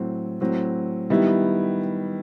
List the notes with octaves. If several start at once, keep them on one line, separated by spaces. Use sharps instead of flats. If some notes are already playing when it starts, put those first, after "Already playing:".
Already playing: A2 F#3 C4
A2 F#3 C4
D#3 G3 B3 E4 G4